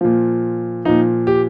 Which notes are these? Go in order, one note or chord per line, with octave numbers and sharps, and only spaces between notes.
A#2 F3
A#2 F3 D#4
G4